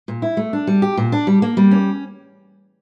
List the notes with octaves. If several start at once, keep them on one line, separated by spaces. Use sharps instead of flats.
A#2
E4
A3
D4
G3
G4
A#2
D4
G3
A#3
G3
C#4